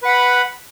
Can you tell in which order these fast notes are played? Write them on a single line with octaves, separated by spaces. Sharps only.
B4 F#5 B5